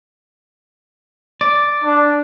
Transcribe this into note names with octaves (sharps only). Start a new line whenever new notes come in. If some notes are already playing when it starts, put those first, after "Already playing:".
D5
D4